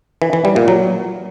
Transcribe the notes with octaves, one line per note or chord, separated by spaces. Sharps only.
E3
E3
G3
A#2
F#3